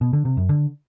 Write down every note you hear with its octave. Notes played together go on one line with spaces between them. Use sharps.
B2
D3
C3
F#2
D3